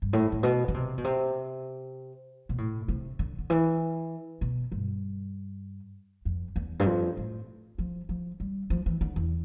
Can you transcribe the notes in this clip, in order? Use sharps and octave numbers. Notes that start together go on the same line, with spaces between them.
G2
A2
A2
B2
D3
C3
B2
C3
B2
A2
C3
D3
D3
E3
B2
G2
F2
E2
G2
F2
A2
F3
F3
G3
F3
E3
D3
E2